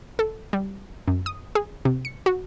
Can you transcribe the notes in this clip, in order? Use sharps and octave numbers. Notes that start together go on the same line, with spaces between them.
A4
G3
F#2
D#6
G#4
C3
C#7
F#4